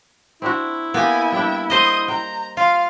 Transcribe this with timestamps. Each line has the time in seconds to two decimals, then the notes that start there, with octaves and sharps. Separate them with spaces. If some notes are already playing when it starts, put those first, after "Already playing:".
0.42 C4 D4 E4 F#4
0.94 A#3 B3 G4 G#5
1.32 G3 D4 G5
1.70 C5 D#5 D#6
2.08 G5 A#5
2.57 F4 F5